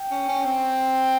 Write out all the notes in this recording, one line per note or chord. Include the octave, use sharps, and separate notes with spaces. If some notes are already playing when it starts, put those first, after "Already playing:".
Already playing: G5
C#4
C#4
C4 G5